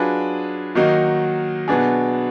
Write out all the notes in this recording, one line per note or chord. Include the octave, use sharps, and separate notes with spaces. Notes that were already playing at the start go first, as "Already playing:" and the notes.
Already playing: F#3 D4 F4 G#4 B4
D#3 F#3 A#3 D#4 F#4
B2 F#3 B3 D4 G#4